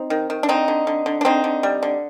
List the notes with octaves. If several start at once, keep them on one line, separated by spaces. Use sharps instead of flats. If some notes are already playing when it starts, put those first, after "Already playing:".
Already playing: C4 D#4
D#3
D#3
D4
D3 C4 D#4
D3
D3
D3
D4
D3 C4 D#4
D3
G3
D3